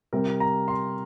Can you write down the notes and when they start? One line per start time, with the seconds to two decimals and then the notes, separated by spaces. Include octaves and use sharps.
0.13 C3 G3 C4 A#4
0.40 A#5
0.68 C6